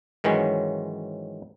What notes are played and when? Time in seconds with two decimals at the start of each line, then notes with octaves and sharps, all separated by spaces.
0.24 G#2 D#3 E3 F#3 G#3 C#4